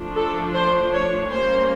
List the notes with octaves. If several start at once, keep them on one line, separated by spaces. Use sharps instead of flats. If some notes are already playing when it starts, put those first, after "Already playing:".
Already playing: F3 A3 D4
A4
C5
C#5
G3 A#3 C#4 C5